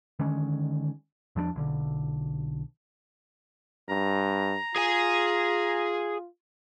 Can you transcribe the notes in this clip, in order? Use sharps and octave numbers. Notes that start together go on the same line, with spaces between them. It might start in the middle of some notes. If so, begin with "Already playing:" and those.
D3 D#3 G#3 C#4
E2 F3 G#3 D4
B1 D3
G2 A#5
F4 G#4 G#5